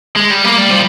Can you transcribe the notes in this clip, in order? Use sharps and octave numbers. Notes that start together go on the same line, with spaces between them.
G#3
G3
A#3
G3
F3